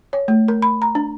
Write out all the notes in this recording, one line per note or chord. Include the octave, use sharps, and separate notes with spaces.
C#5
A3
A#4
B5
A#5
D4